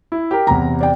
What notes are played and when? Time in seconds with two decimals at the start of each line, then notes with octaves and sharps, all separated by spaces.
0.12 E4
0.31 G4 A#4
0.47 E2 C3 A#5
0.80 D5 G5